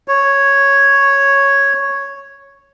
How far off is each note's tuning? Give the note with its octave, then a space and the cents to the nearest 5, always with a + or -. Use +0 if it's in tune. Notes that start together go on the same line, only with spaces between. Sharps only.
C#5 -5